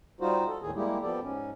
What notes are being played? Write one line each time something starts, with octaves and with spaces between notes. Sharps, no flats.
G3 D#4 F4 F#4 C5
A4
D#2 A2 D#3 G#4
G3 G#3 A#3 E4 G4
F3 B3 G4 A4 D5
G#2 C#4